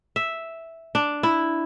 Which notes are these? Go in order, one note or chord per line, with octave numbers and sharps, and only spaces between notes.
E5
D4
E4